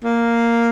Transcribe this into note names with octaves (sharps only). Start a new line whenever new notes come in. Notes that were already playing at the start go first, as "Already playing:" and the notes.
A#3